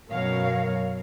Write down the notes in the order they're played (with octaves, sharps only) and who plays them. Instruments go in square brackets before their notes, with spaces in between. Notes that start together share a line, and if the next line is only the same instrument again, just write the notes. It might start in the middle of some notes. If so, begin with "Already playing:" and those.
[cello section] F#2 B2 F#3 A#4 C#5 F5